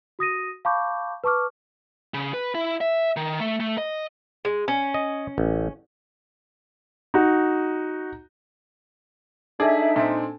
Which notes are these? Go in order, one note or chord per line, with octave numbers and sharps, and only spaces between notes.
F#4 D#6 A#6 D#7
F5 A5 B5 C#6 D6 G6
B4 A5 C#6 D6 F6
C#3
B4
E4
E5
D#3
A3
A3
D#5
G#3
C#4
D#5
A1
D#4 F#4
D4 D#4 G#4 A4 D5 E5
A#2 C4